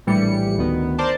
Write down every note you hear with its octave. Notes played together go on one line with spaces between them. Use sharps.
A#1 A2 E3 G3 C#7
D2 D#3 B3
A#4 C5 D5 A5